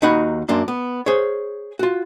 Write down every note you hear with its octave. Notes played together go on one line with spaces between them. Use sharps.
D#2 D#3 D#4 F#4 F#5 B5
F#2 A#3 D4 C6
B3
G#4 C5 C#5
F4 F#4